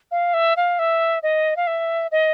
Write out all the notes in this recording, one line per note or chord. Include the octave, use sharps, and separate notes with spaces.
F5
E5
F5
E5
D#5
F5
E5
D#5